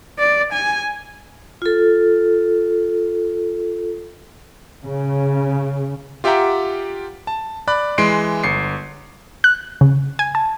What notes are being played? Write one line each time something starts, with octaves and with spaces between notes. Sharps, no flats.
D5
G#5
F4 A4
C#3
F4 G4 E5 F#5 G5 A#5
A5
D5 B5 F#6
E3 G#3 C6 C7 D7
G1 C7 C#7
F#6
C#3
G#5
A5